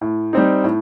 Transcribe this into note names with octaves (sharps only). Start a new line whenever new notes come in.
A2
G3 C4 D#4
A2